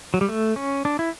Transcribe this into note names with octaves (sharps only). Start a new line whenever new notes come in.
F#3
G3
A3
C#4
D4
E4